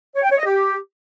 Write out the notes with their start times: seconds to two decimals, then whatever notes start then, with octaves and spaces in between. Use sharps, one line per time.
0.15 C#5
0.23 G5
0.30 C#5
0.37 D#5
0.45 G4